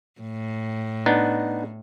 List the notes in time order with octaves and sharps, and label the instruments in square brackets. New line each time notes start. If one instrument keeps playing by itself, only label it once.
[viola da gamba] A2
[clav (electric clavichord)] B3 D4 D#4